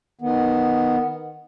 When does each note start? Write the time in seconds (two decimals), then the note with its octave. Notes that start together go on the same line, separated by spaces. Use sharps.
0.21 D#3 B3